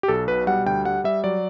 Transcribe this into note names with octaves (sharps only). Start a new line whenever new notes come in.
G4
B1 A4
B2 B4
G3 F#5
D2 G5
G3 F#5
G3 E5
F#3 D5